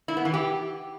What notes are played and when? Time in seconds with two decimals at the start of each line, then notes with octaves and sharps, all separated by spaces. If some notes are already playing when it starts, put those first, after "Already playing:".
0.08 E4
0.17 B3
0.25 E3
0.34 G4